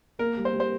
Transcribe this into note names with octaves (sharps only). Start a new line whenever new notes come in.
A#3 A#4
G3
C5
G3
C5